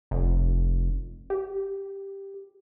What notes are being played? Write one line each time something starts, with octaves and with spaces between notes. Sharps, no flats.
F1
G4